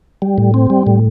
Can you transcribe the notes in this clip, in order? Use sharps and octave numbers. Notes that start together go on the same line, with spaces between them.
G3
A2
C4
G3
A2